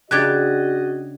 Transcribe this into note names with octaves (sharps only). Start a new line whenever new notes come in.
C#3 D4 F#4 G4 D#5 F#6 G#6 A6